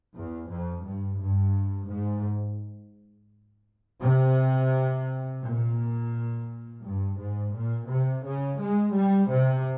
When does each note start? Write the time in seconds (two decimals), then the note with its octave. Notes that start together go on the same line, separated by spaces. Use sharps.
0.15 E2
0.49 F2
0.85 G2
1.20 G2
1.90 G#2
4.02 C3
5.44 A#2
6.84 G2
7.19 G#2
7.55 A#2
7.90 C3
8.26 C#3
8.60 G#3
8.96 G3
9.31 C3